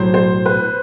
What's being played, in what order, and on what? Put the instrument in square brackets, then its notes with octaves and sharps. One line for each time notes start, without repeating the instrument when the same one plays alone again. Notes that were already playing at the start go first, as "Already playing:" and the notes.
Already playing: [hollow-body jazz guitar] B1 A2 F#3 [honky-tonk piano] C5
[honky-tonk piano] C5
B4